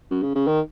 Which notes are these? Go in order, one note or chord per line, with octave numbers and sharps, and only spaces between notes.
F#2
C#3
C#3
D#3